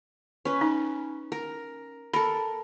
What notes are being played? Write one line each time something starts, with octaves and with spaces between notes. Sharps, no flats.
C#4 B4
D#4
A#4
A4 A#4 B5